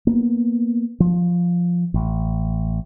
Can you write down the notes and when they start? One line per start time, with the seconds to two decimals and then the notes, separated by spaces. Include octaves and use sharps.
0.07 A#3 B3
1.00 F3
1.94 A1